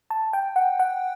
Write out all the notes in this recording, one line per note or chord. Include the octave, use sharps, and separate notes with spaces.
A5
G5
F#5
F#5